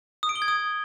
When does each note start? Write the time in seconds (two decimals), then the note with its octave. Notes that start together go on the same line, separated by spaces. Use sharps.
0.23 D#6
0.29 D7
0.36 G7
0.42 G#6
0.48 D#6